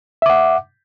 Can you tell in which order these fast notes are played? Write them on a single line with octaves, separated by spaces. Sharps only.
E5 D6 F#5